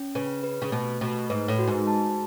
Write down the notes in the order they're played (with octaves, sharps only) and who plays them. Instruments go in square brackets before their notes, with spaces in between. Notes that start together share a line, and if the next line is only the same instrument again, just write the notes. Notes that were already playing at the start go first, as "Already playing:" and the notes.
Already playing: [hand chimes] C#4
[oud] C#3 [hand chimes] B4
[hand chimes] B4
[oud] C#3
[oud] B2 [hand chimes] A3
[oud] B2 [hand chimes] A3
[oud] G#2 [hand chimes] B4
[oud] A2
[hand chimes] F#4
[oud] G#2
[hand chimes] A5